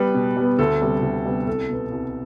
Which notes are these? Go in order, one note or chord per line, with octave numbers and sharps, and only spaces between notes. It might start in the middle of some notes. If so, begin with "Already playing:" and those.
Already playing: G3 B3 B4
B2
G3 B3
D2 A4
C3 G3 B3
D2
C3 G3 B3
C2 A4
B2 B3
C2